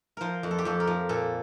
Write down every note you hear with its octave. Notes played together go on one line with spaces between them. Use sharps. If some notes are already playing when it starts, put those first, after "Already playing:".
F3 A#4 C5
F2
A4
G4
F2 A4
A#4
F3
A#2 A4